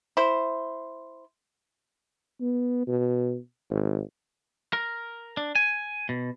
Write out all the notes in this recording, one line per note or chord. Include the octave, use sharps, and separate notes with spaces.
E4 C5
B3
B2
G#1
A#4
D4
G#5
B2